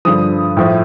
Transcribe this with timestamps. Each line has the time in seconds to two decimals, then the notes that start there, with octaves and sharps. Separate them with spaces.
0.05 G2 D3 F3 D#6
0.57 A2 F3